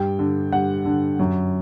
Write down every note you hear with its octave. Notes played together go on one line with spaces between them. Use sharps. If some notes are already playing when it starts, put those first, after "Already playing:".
Already playing: G2 G5
D3
G2 F#5
D3
F#2